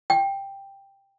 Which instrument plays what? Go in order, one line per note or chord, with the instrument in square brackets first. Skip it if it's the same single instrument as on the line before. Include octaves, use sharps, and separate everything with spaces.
[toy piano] G5